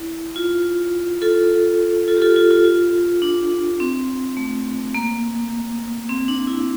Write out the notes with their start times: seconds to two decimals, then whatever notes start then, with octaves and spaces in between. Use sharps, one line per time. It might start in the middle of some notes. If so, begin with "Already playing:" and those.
Already playing: E4
0.36 F4
1.22 F4 A4
2.08 F4 A4
2.17 G4
2.22 F4 A4
2.36 F4
2.51 F4
2.65 F4
3.22 D4
3.80 C4
4.37 A3
4.95 A#3
6.09 C4
6.28 D4
6.47 E4